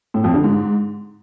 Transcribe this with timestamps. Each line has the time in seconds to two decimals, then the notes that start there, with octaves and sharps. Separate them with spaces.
0.14 A2
0.24 F2
0.34 D3
0.44 G#2